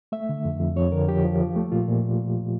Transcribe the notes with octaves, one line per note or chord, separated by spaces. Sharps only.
A3 E5
D3
F2
F2
F2 C#5
D3 A#4
F3 G4
F3
F3
A3
A#2 F4
A#2